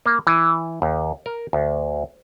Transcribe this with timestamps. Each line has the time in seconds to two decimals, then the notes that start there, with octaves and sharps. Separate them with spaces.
0.06 A#3
0.27 E3
0.82 D#2
1.26 A#4
1.53 D2